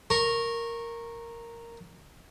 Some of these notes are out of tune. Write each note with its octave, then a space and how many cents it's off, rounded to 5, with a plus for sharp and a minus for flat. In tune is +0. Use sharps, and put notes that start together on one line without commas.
A#4 -5 C#6 -20